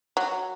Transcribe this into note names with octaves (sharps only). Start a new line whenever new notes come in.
F#3